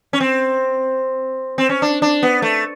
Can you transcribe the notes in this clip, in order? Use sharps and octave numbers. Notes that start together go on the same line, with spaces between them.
C#4
C4
C4
C#4
D4
D4
B3
A3